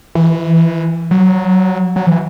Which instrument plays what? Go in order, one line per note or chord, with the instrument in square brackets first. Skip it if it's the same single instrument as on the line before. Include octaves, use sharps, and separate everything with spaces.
[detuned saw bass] E3
F#3
F#3
E3